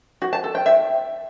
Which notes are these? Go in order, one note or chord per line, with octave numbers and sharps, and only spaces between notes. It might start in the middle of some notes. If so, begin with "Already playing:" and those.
F#4
A5
A4
G5
E5